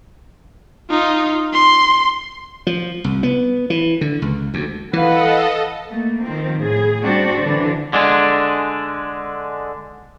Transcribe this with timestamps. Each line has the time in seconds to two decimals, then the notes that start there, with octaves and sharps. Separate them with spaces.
0.90 D#4 F4
1.53 C6
2.67 F3
3.04 C2
3.23 B3
3.70 E3
4.01 D3
4.22 C#2
4.54 D2
4.93 E3 A4 B4 D#5 F5 F#5
5.90 A3 A#3
6.24 D#3 F3 C4
6.62 A2 G#4
7.03 G3 C4 D4 F#4
7.42 D3 E3 D4
7.93 D3 G#3 D4